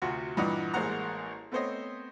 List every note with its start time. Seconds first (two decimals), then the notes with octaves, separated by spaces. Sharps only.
0.02 D2 C3 F4 F#4
0.37 G2 A#2 E3 D5 D#5 F#5
0.74 A1 G#3 A#3 C5 F#5 A#5
1.52 A3 B3 C4 C5 C#5 D#5